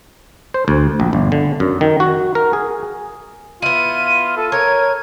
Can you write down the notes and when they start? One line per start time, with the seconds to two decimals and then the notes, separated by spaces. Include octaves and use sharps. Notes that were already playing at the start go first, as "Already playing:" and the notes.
0.54 C5
0.68 D2
1.00 A#1
1.13 G1
1.32 D3
1.60 F#2
1.81 D#3
2.00 F#4
2.35 A#4
2.53 G#4
3.62 B3 E4 F4 D#7
4.37 A4
4.52 A#4 C#5 G#6